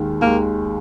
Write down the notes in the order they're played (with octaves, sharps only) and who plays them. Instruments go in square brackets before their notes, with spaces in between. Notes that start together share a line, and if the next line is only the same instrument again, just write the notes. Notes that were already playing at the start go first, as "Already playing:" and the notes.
Already playing: [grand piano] D#2 D#3 G#3
[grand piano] D#2 D#3 G#3 [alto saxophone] A#3